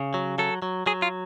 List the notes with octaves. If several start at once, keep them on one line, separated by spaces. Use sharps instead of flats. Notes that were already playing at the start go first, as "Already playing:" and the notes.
Already playing: C#3
F#3
F#3 A4
F#3
F#3 G#4
F4